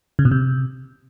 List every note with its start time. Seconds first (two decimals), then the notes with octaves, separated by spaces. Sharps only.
0.19 C#3
0.25 B2
0.31 C3